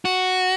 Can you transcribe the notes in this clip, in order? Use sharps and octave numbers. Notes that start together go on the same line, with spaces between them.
F#4